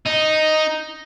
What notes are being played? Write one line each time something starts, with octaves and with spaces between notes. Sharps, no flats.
D#4